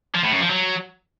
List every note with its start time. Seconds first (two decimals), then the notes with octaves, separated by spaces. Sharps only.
0.15 F3
0.23 A2
0.32 F#2
0.41 F3
0.50 F#3